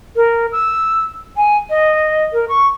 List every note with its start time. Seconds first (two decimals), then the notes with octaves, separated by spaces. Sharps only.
0.16 A#4
0.52 E6
1.36 G#5
1.69 D#5
2.33 A#4
2.48 C#6